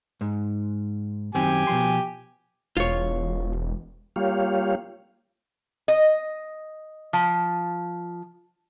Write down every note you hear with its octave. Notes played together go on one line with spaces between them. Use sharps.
G#2
F#2 D#3 C4 G4 G#5
B2 F3 C6
E1 F4 C#5
G3 A#3 F4 G4 C#5 F5
D#5
F3